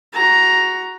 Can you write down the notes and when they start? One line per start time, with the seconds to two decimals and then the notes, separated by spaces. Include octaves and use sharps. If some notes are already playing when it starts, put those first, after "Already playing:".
0.13 F#4 A#5